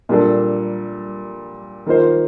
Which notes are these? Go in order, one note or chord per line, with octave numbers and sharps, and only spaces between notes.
A#2 G3 A#3 D4 A4
D#3 A#3 F4 C5